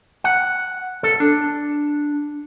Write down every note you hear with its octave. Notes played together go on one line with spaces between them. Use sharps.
F#5
A4
D4